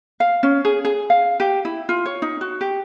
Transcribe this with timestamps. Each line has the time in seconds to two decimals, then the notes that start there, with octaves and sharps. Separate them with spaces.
0.20 F5
0.43 C#4
0.65 G#4
0.85 G#4
1.10 F5
1.40 G4
1.65 E4
1.89 F4
2.06 C#5
2.22 D#4
2.41 F#4
2.61 G4